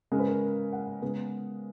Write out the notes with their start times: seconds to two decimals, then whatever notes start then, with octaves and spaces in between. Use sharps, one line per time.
0.12 C#3 G#3 C#4 A#4
0.19 B4
0.27 A#4
0.73 F#5
1.02 C#3 G#3 B3